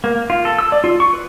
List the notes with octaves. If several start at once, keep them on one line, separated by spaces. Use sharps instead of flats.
A#3
F4
A4
E6
D5
F4
C#6
B4